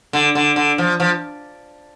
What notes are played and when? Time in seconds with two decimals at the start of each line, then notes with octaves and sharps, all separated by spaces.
0.13 D3
0.35 D3
0.56 D3
0.78 F3
1.00 F3